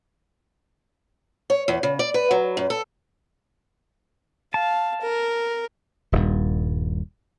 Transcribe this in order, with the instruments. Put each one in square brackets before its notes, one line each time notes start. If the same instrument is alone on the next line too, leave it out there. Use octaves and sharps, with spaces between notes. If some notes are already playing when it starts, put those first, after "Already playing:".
[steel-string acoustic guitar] C#5
E2
C#3
D5
B4
F#3
F#2
A4
[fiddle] F5 [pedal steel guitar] A5
[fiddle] A#4
[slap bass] D#1 G2